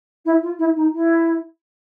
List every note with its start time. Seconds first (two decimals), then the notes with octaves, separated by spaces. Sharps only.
0.25 E4
0.42 F4
0.58 E4
0.75 D#4
0.92 E4